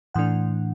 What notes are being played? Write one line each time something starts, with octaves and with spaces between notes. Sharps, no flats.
A2 E3 A3 D4 F#5